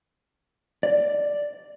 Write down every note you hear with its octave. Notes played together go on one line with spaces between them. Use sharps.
D5